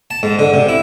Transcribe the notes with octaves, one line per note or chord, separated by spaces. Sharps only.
A5
G#2
D3
C3
E4